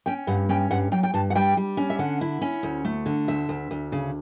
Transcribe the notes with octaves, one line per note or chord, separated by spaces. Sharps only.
C#4 G5
G2 F#5
C#4 G5
G2 F#5
F#3 G5
G5
G2 A5
F#5
G3 G5
G3
C#4
E5
D3 F#5
E4
C#4
D2
A3
D3
D2 E5
D2
D2
C#3